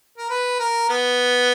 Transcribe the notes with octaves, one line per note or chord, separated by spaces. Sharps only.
A#4
B4
A#4
B3